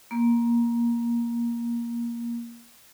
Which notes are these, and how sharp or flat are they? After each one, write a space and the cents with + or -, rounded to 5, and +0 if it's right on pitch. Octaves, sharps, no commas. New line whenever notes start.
A#3 +15